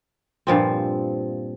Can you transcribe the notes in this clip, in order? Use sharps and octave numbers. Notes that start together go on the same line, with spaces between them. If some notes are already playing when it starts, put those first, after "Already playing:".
G2 A#2 F3 C4